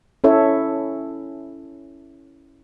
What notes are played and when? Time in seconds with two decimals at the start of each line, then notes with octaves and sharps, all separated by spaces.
0.24 C#4 E4 A4 C#5 E5